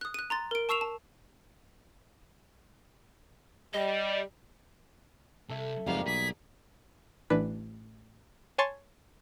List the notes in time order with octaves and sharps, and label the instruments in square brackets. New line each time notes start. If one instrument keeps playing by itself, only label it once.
[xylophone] D#6 F#6
F#6 D#7
A#5 C6 A6
A#4 D7
A5 C#6 E6 C7 E7 F7
A5
[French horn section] G3 [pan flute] D#5
[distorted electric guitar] C2 C3 [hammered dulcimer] A4 E5
[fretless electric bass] F#1 F2 G#2 [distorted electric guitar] C3 [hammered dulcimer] G3 A#3 F#4 [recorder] F5
[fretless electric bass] B1 [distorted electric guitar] G#4 [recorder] B6
[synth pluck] A1 E3 D4 B4
C#5 G#5 A5 C6 C#6 A6